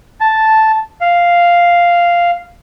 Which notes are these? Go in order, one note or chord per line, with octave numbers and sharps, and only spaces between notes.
A5
F5